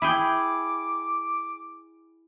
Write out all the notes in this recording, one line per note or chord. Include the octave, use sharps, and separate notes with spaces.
E4 G#4 G5 D6